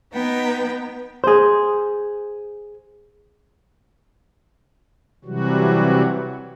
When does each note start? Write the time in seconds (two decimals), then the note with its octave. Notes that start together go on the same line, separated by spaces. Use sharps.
0.13 B3 D#4 G5
1.24 G#4 C5
5.25 C3 E3 F#3 G3 F#4